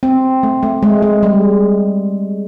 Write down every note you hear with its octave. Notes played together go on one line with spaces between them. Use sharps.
C4
A3
A3
G#3
G#3
G3